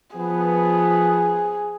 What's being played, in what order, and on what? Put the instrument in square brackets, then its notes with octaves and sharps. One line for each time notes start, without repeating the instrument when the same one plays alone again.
[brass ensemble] F3 B3 [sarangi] G#4